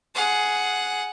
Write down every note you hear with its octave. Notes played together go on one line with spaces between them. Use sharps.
G#4 F#5